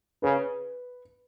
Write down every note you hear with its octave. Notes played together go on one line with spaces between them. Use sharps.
C#3 B4